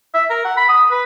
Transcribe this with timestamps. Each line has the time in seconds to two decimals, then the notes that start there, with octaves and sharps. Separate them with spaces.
0.14 E5
0.30 A#4
0.45 F#5
0.57 B5
0.69 D#6
0.91 B4